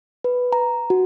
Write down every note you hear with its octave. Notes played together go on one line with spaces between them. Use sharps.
B4
A#5
F#4